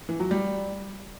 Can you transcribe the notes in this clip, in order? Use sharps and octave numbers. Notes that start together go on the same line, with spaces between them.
E3
F#3
G3